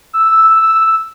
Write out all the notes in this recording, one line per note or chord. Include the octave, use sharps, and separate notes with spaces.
E6